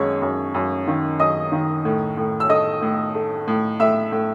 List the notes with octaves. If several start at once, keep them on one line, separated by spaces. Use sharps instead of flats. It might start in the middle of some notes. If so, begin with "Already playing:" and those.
Already playing: F#2 D#3 G#3 C#5 C#6
F#2
F#2
D#3
F#2 D#5 D#6
D#3
A2
A2
E6
A3 D#5 D#6
A2
A3
A2
A2 E5 E6
A2